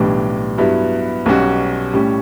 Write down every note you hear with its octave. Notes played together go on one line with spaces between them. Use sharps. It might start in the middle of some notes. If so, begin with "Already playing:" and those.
Already playing: B1 A2 E3 G3 D4
G2 F#3 B3 E4
B1 B2 G3 C#4 F#4
A2 G3 C#4